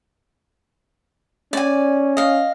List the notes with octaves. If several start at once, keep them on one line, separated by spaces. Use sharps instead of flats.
C#4 D5 G#5
D#5 F5